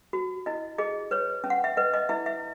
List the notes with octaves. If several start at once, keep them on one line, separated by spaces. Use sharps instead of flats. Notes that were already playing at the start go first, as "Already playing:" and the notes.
F#4
E4 D#5
G#4 D#5
B4 C#5
C#4
F#5
E5
B4 D#5
D#5
E4 E5
E5